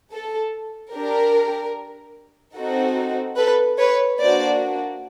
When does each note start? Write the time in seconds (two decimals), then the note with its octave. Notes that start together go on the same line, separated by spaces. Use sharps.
0.12 A4
0.94 D4 G4 A#4
2.57 C4 D#4 F#4 A4
3.38 A4 B4
3.79 B4 C#5
4.20 A#3 D4 F#4 C5 D5